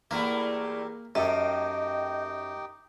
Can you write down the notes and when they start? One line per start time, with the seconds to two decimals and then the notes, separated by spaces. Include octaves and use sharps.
0.11 E2 A3 A#3 E4 G4 A#4
1.15 F#2 A#3 D#4 G4 A4 D#5 G5